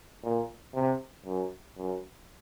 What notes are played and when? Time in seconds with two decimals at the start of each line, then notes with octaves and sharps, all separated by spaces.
0.24 A#2
0.75 C3
1.26 F#2
1.77 F#2